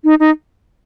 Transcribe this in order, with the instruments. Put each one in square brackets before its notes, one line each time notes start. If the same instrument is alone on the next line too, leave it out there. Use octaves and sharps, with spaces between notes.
[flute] D#4
D#4